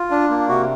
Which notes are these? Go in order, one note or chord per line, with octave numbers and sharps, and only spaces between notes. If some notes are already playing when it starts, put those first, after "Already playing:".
Already playing: F4
D4
A#3
C3 F#4